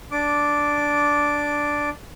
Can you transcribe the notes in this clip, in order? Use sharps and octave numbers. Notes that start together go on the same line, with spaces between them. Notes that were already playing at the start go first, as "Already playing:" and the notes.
D4 D6